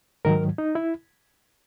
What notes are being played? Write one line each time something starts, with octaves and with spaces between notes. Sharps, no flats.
G#2 D#3 F#3 A#4
D#4
E4